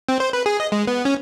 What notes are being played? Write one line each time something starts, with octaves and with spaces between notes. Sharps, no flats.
C4
C5
B4
G#4
D#5
G#3
B3
C#4